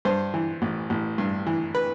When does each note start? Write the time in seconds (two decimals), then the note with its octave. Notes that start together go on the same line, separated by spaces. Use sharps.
0.05 G2 C5
0.34 E3
0.62 A1
0.90 A1
1.18 G2
1.47 E3
1.75 B4